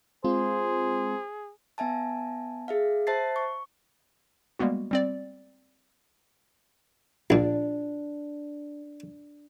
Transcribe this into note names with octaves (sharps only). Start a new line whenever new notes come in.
G#3 C4 F4 G#4 C5
B3 E5 G#5 A5
G#4 E5 F5
C5 E5 A5 A6 C7
C#6
G3 G#3 A#3 B3 F#4
G3 C4 D5
A#1 A#2 D4